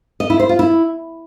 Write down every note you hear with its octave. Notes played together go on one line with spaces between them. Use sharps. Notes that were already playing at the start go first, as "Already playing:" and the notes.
D#5
E4
C5
F4
E4